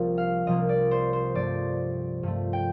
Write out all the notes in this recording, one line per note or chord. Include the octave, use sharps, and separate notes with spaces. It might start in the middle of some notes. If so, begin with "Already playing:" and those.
Already playing: C2 C3 F3 A#3 D4
F5
C2 C3 F3 A#3 D4 D#5
D5
C5
C5
G2 F3 A3 D5
G2 F3 A3
G5